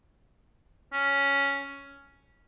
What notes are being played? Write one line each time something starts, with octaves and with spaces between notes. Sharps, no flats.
C#4